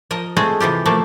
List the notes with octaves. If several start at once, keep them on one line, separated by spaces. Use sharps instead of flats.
F3 A#4 D#5
G#3 A3 C4 G#4
C3 E3 F4 G4
F3 A3 A#3